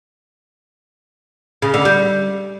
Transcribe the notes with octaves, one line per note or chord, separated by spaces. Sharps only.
C#3
D3
G3